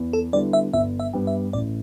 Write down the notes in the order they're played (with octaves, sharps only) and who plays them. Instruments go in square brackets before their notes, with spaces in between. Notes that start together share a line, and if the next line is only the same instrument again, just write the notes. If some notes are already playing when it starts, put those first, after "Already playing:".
Already playing: [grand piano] E2
[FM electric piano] A4
[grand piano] D3 G3 B3 E4 [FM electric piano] D5
[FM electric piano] E5
[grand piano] G1 [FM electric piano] E5
[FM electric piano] E5
[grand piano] G2 G3 B3
[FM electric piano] E5
[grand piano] A1 [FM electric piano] D5